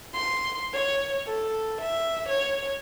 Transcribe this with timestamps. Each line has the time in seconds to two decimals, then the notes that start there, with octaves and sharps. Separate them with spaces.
0.14 C6
0.73 C#5
1.26 A4
1.81 E5
2.28 C#5